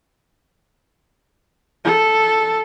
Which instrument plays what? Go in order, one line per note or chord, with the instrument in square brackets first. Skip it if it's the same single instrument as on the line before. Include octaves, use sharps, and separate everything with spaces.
[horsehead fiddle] A4